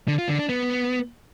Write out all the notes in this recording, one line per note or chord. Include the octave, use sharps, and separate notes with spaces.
D3
F4
D3
D4
B3